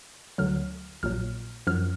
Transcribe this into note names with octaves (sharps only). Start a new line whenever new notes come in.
D2 D3 F#3 F6
A#1 A#2 F#3 F6
F#2 F3 F6